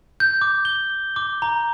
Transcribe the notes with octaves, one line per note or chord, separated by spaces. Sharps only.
G6
D6
G7
D6
A#5